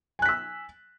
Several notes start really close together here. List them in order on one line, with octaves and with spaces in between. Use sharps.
G#5 F#6 B6 E6